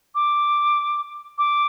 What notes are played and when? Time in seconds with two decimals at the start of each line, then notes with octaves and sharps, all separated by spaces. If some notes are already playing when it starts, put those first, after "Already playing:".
0.15 D6
1.38 D6